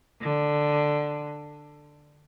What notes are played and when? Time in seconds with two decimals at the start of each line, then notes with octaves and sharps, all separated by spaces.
0.22 D3